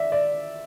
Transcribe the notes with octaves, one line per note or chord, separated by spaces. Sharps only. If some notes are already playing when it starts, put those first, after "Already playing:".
Already playing: D5 E5
D5